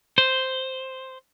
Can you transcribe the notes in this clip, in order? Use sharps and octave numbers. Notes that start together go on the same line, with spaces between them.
C5